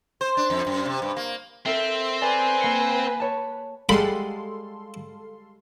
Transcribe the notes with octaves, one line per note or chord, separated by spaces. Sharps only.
C5
D4
F2
F#2
C3
G2
A#3
C4 A4 A#4 E5
B4 D5 G#5
A#3 C7 C#7
C#5 A5
G3 G#3 A4 F5 F#5 B5 C6